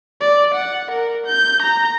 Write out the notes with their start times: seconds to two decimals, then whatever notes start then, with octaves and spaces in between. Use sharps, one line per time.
0.21 D5
0.54 F#5
0.91 A#4
1.26 G6
1.62 A#5